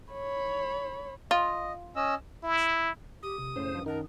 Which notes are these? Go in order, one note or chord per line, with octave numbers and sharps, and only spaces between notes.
C#5 B5
F4 D#5
C#4 D#5 E6
E4
G4 D#6
C3
F#2 A2 C#3 C5
G2 F3
D#3 D#4 A#4 F#5 A5